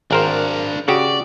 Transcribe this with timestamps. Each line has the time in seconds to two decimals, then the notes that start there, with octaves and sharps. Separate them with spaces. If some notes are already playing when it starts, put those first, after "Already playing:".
0.11 G#1 D4 A#4 C5 F5
0.88 C#3 F#4 G4 D5